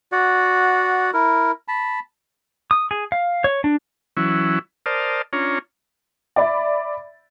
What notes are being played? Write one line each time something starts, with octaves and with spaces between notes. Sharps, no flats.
F#4 D5 F#5
E4 A#4
A5 B5
D#6
G#4
F5
C#5
D4
E3 F#3 C#4 E4
A#4 C5 D5 A5 D#6 F6
C#4 D4 F4 C#5 A#5
D5 E5 B5 A6